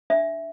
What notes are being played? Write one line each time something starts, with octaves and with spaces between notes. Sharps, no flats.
D4 E5